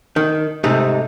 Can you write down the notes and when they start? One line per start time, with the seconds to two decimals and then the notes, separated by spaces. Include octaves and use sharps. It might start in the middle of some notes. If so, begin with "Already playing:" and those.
0.16 D#3
0.64 G#2 C3 G3 A3 D#4 G#4